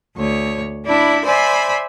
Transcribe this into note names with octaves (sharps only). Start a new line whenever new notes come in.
D2 C#5
D4 E4 B5
C5 D5 E5 G#5 B5